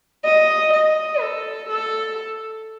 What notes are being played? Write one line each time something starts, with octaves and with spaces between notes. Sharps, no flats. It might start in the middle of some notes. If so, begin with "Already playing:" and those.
D#5
D#5
A4
A4